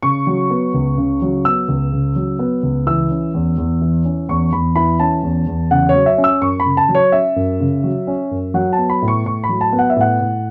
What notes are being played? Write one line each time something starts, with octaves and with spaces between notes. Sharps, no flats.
C#3 C#6
F#3
B3
C#2
C#3
F#3
B3 E6
C#2
C#3
F#3
B3
C#2
E3 E6
C#4
E2
E2
E3
C#4
E2 C#6
E2 B5
E3 B5
C#4 A5
E2
E2
C#3 F#5
C#5
F#3
E5
C#4
E6
F#2 C#6
B5
C#3
A5
F#3
C#5
C#4 E5
F#2
C#3
F#3
C#4
F#2
F#3 F#5
A5
B3
B5
A2
C#6
A2 C#6
B5
F#3
A5
B3
F#5
E5
A2 F#5
A2